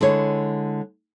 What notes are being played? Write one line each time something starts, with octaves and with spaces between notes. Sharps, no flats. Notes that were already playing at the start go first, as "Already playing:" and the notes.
D3 G#3 E4 C#5